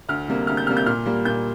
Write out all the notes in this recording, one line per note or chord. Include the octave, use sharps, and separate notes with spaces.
D2 F6
C3 G3 A#3
D2 F6
G6
C3 G3 A#3 F6
G6
A#2 F6
G3 A#3
A#2 G6